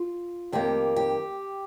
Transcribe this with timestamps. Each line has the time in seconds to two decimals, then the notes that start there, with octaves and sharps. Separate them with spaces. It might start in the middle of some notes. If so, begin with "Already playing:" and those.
Already playing: F4
0.52 F2 D#3 A#3 G4
0.96 G4